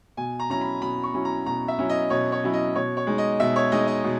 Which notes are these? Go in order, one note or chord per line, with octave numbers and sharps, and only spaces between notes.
B2 G#5
A#5
F#3 C#4 E4 A#5
B5
B2 B5
C#6
F#3 C#4 E4
A#5
B2 A#5
E5
F#3 C#4 E4
D#5
B2 C#5
C#5
F#3 C#4 E4
D#5
B2 C#5
C#5
G#3 D#4
D#5
B2 E5
C#5
G#3 D#4 D#5
D#5
B2